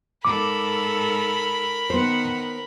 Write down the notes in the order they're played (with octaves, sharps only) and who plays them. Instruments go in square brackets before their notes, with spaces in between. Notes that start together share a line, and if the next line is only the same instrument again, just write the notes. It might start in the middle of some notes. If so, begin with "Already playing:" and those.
[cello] G#2 A4 [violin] A#4 B5 [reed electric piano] D6
[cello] D#3 F#5 [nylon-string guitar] B3 C5